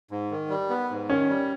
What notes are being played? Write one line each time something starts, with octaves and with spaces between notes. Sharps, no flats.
G#2
D#3
G3
B3
G#2
D#3 C#4
G3